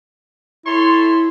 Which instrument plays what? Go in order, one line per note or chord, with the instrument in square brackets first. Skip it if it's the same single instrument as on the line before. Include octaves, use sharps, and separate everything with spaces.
[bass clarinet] E4 [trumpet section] A4 C#5 C6